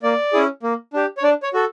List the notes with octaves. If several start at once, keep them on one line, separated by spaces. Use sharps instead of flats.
A#3 D5
C#4 E4 G#4
A#3
D4 G4
C#5
D4 D5
C#5
F#4 A4